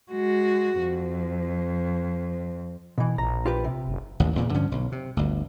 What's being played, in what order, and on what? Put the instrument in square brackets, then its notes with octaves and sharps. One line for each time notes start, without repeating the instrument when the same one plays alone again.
[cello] G#3 F#4
F2
[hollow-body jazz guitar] B2 E3
[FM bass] A#1 [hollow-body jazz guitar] A#5
[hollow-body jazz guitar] F4 G4 B4
C3
[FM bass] F#1
[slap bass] A1 D#2
E2 A#2 C#3
G2 D3 F3 C#4
B1
C3
G1 D2